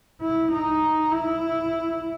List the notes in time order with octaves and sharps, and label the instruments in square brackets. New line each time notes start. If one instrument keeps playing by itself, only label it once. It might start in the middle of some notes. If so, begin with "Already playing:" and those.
[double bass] E4
D#4
E4